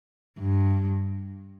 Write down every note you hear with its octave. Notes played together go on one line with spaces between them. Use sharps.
G2